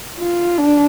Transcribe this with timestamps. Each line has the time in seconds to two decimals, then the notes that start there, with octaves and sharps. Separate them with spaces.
0.19 F4
0.58 D4